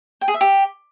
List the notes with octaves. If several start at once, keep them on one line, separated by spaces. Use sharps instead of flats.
G5
G#4
E5
G4